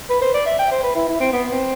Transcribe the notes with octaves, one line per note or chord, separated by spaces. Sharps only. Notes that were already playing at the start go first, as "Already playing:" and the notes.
B4
C5
D5
E5
G5
C5
B4
E4
E4
C4
B3
C4